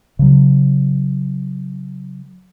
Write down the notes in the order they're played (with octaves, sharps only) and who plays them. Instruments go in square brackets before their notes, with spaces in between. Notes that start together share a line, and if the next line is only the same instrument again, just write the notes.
[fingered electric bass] C#3 F#3